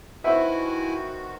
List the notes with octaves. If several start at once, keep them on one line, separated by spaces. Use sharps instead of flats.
D#3 E4 F#4 B4 C5 E5 F#5 G#5